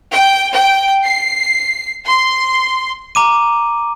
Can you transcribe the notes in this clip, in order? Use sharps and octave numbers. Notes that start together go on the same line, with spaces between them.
G5
G5
C7
C6
A#5 D6 D#7